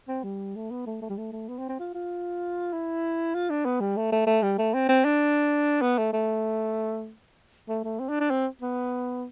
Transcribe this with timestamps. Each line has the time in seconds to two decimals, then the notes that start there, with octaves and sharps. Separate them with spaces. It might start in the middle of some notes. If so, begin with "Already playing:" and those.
0.08 C4
0.24 G3
0.56 A3
0.71 B3
0.86 A3
1.02 A3
1.09 G3
1.18 A3
1.32 A3
1.48 B3
1.58 C4
1.69 C4
1.79 F4
1.94 F4
2.73 E4
3.34 F4
3.50 D4
3.65 B3
3.80 G3
3.97 A3
4.12 A3
4.27 A3
4.42 G3
4.58 A3
4.74 C4
4.89 C4
5.05 D4
5.82 B3
5.98 A3
6.13 A3
7.69 A3
7.84 A3
7.99 C4
8.09 D4
8.21 D4
8.31 C4
8.62 B3